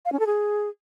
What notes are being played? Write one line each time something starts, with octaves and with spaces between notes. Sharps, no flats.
F5
C#4
A4
G#4